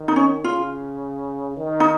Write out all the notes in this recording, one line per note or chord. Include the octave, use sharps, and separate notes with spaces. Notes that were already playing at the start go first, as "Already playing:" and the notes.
Already playing: D#3
D#4
C#4
C#3 F4
D#3
D#4